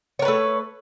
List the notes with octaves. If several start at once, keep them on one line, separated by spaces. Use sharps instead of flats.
A3 A#4 B4 C#5